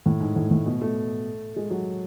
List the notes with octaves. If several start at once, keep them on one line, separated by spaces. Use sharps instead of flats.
A2
G#2
A2
A2
B2
A3
G#3
F#3